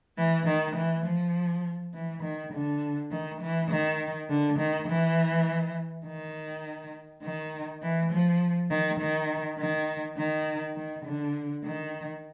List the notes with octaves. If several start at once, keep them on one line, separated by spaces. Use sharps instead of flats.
E3
D#3
E3
F3
E3
D#3
D3
D#3
E3
D#3
D3
D#3
E3
D#3
D#3
E3
F3
D#3
D#3
D#3
D#3
D#3
D3
D#3